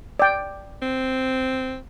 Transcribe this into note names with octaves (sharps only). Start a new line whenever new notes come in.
D5 G5
C4